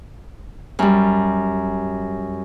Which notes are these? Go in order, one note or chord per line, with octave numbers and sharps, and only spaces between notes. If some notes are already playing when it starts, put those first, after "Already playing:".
F#2 G3